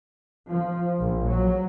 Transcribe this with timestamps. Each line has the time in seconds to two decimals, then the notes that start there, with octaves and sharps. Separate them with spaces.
0.50 F3
0.99 A#1
1.28 F#3